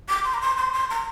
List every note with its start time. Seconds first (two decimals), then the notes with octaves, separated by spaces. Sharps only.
0.09 D6
0.25 C6
0.34 A#5
0.42 C6
0.57 C6
0.73 C6
0.90 A#5